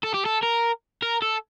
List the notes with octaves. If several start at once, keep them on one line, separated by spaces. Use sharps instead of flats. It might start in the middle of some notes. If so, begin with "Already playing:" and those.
A4
G4
A4
A#4
A#4
A4